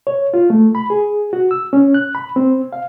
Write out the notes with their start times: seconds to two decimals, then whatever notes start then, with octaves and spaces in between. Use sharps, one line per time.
0.07 C#5
0.34 F4
0.50 A3
0.75 B5
0.90 G#4
1.33 F#4
1.51 E6
1.73 C#4
1.94 F#6
2.15 B5
2.36 C4
2.73 F5